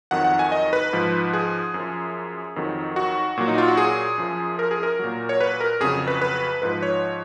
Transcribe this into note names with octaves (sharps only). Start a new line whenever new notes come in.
F2 D#3 F#3 F#5
F#5
G#5
D#5
B4
G#2 F3
G#4
F#2 F3
F2 D#3 F#3
F#4
A#2 F#3
D#4
F4
F#4
G#4
F#2 F3
A#4
G#4
A#4
A#2 F#3
C#5
B4
A#4
F2 C#3 F#3 G#4
B4
B4
G#2 F3 B4
C#5